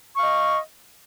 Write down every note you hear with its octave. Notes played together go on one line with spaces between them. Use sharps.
D#5 F5 C#6